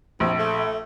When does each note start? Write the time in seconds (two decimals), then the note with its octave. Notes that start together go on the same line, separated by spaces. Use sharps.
0.20 A#1 C4
0.39 A3